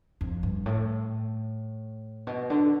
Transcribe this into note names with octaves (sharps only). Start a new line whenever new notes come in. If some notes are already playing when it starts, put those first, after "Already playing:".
F2
G2
A2
B2
D3